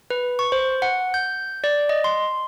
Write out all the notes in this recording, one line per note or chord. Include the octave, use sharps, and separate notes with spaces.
B4
C#6
C5
F#5
G6
D5
D#5
C6